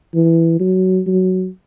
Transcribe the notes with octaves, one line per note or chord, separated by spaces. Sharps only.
E3
F#3
F#3